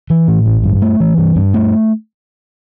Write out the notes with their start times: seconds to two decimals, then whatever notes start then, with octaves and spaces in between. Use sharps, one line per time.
0.10 E3
0.28 A2
0.46 A1
0.63 G2
0.82 A3
1.00 E3
1.18 G2
1.36 G2
1.54 A3